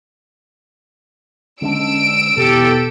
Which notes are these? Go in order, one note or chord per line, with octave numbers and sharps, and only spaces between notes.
D3 G#3 C#4 D4 E6 D7
E2 B2 G4 A4